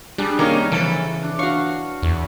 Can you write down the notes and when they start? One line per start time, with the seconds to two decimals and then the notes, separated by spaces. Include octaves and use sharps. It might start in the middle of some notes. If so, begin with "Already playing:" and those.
0.18 G3 D4 G#4
0.39 D#3 A#3 C4 C#4 D#4 A#4 C#5 F5
0.72 C#3 E3 F3 A4
1.23 D4
1.39 F#4 C#5 F5
2.02 E2